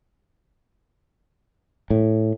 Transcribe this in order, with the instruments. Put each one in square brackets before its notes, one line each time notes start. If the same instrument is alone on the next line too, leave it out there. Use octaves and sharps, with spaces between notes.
[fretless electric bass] A2